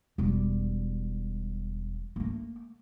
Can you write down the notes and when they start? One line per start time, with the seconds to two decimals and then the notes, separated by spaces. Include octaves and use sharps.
0.18 E1 G3
2.16 A3 A#3